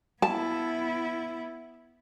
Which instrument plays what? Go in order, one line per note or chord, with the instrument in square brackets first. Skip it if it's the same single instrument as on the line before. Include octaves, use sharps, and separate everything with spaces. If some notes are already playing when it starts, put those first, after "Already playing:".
[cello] B3 E4 [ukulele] A5